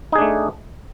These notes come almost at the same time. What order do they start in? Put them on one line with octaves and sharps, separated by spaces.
D#4 G#4 D4 A3